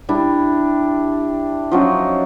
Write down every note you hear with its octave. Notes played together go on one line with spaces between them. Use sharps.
G3 D4 E4
F3 F#3 C#4 D#4